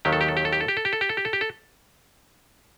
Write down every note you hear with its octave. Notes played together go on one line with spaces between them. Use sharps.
D#2 D#3 F#3 G4
A4
G4
A4
G4
A4
G4
A4
G4
A4
G4
A4
G4
A4
G4
A4
G4
A4